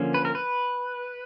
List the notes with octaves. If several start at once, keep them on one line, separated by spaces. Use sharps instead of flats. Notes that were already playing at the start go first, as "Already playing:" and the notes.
Already playing: D3 F3 A#3 C#4
B4
A#4
B4